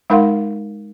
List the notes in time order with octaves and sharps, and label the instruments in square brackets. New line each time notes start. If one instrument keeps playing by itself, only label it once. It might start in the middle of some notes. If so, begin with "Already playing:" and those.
[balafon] G#3 D#4 A#4 F5 F#5 C6